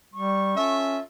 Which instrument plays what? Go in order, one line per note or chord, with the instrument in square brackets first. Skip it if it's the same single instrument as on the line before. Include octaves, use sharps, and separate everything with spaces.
[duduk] G3 [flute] C#6
[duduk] C#4 [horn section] F4 A4 E5